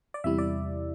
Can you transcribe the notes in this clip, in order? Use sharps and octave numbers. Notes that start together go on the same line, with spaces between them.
D5
E2 C3 G3 E4 E5
D5